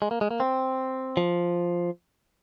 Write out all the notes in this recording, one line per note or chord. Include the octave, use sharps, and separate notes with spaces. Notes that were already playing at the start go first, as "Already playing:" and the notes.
G#3
A#3
G#3
A#3
C4
F3